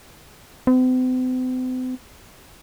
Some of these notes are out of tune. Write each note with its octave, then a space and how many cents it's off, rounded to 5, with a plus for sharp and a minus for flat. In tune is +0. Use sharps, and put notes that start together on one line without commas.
C4 -45